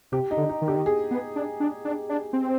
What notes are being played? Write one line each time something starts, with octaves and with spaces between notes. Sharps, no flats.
C3 G4
D#4
D3
D#4
D#3
D3 G4
D#3
G#4
B3
D4
D4
D4
D4
C4